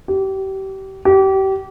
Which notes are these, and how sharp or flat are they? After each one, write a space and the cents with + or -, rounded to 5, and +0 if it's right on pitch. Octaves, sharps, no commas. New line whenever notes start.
G4 -30
G4 -30